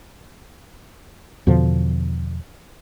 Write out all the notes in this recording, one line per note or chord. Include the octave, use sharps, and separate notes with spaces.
E2 B2 D3 F3